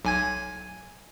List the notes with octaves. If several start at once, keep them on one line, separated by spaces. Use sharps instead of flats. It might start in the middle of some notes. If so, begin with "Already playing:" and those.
B1 G#5 G#6